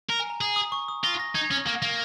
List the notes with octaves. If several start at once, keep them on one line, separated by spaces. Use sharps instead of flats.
A#4 A#5
G#5
A#5
G#4
D#6
C#6
D#6
F4 A#6
A#6
D#4 G#6
C#4
A#3
A#3